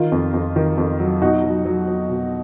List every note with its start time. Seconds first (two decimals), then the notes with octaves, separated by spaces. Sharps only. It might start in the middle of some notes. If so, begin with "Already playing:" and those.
Already playing: D#3 F4
0.12 F2
0.34 F2
0.56 D#3
0.78 F2
1.00 F#3
1.21 B2 D#4 F#4
1.44 F#3
1.65 F#3
1.88 F#3
2.10 B2